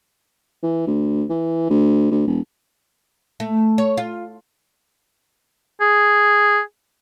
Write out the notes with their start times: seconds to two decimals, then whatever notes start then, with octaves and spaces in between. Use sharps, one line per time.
0.63 E3
0.87 D2
1.29 E3
1.70 D2
2.11 D2
2.27 E1
3.40 A3
3.78 C#5
3.97 F4
5.81 G#4